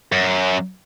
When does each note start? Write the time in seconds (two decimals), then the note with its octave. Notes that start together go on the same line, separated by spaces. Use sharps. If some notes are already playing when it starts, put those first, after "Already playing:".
0.12 F#2